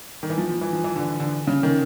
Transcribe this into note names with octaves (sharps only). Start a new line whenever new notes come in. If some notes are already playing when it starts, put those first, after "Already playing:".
D#3
E3
F3
F3
E3
F3
E3
D3
D3
C#3
D#3